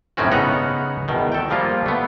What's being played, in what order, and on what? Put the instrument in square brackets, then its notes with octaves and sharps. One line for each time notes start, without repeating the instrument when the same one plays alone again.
[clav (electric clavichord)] F#2 A2 D#3 C4 C#4 F#4
C#3 B3 D#4 F#5 A#5
E2 B2 D#3
A4 G5
F3 G3 A#3 F4
A3 B3